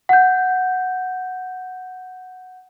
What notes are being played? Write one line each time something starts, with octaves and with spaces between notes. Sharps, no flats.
F#5 G6